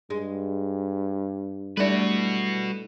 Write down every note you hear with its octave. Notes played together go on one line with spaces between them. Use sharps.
G2 G#3
G3 A3 D4 E4 F#4 B4